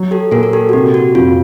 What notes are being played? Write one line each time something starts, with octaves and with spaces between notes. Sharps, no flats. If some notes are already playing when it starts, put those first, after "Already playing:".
Already playing: F#3
G4 A4
A#2 G#4 A#4
A#4
G4 A4
F#4
C3 G4
F#4
F2 F4